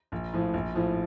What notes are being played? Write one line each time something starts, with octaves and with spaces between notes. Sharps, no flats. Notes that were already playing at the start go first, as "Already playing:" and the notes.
A#1
A2 F3
A#1
A2 F3